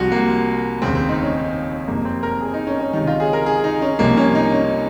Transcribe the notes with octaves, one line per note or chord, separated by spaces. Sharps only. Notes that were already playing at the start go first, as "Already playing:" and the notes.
Already playing: C2 C3 F3 F#4
A#3
F1 D#2 C#3 C4
C4
D#4
C#4
F#1 F2 C3 A#3
C4
A#4
G#4
D#4
C#4
C#4
C#2 C3 D#3 D#4
F4
G#4
A#4
G#4
D#4
C#4
C2 C3 F3 A#3
C#4
D#4
C#4